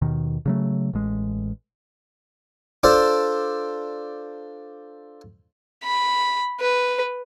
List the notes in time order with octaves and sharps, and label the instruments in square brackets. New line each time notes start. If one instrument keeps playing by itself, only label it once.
[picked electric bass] D#2 B2 D#3
C#3 F#3 A3
A1 G#3
[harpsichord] D4 F4 A4 C5 D5
[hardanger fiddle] B5
B4